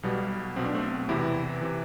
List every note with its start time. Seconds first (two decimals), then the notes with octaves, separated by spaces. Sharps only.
0.03 B1 B2 G3 B3
0.56 B1 B2 C4
0.65 D4
0.74 A3 C4
1.09 E2 C3 E3 E4 G4
1.61 C3 E3